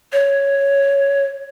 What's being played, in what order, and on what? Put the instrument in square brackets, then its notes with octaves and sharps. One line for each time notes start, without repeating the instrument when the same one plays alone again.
[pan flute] C#5